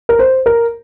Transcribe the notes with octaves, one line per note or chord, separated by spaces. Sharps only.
A#4
C5
A#4